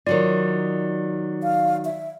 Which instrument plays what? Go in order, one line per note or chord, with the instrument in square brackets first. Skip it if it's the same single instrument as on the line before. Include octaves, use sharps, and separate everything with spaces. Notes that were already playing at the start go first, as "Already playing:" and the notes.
[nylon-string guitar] D#3 F#3 F4 [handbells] D5
[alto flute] F5
E5